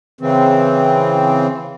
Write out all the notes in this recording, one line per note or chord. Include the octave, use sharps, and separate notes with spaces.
C#3 E3 C4